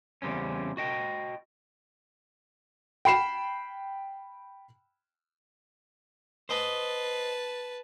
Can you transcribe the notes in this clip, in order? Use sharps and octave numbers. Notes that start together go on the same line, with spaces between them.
E2 C#3 G3 C4 C#4
F#4 D#5 G5
G5 B5 C7 E7
B4 C5 D#5 A5